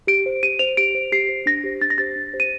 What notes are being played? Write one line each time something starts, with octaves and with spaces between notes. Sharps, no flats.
G4 D7
C5
G4 D#7
C5 F7
G4 D7
C5
G4 C7
C5
D4 A#6
G4 C5
D4 A6
A#6
G4 C5 A6
D4
G4 C5
D#7